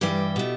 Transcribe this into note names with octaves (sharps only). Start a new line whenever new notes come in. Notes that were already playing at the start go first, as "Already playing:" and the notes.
G2 E3 G3 G4 G5
B2 A3